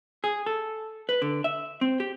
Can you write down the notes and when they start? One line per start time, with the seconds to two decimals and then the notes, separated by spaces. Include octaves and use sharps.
0.24 G#4
0.46 A4
1.09 B4
1.22 D3
1.44 E5
1.81 C4
2.00 G4